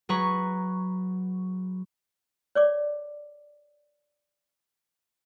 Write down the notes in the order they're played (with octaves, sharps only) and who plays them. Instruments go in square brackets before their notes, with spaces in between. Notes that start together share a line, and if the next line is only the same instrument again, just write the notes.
[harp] F#3 G#4 B4 A#5 C#6
[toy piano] C#5 D5 D6